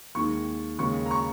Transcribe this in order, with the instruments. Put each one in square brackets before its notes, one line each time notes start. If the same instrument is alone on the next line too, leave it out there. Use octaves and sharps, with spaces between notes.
[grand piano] D#2 D#3 G#3 C#6
D#2 C#3 G#3 C#6
A#5
C#6